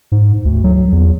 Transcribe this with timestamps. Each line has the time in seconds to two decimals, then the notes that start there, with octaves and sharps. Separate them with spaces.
0.12 G#2
0.45 D2
0.64 F#3
0.92 E2